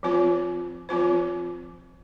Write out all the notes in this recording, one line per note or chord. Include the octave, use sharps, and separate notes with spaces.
F3 C4 F4 C5
F3 C4 F4 C5